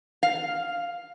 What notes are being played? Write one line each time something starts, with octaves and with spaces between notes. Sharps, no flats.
F5